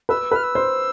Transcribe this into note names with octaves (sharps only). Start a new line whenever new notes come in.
B4 E6
B4
F6
E6
C5